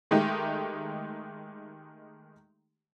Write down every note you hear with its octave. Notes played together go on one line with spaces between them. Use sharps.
D#3 G#3 A3 D#4 G4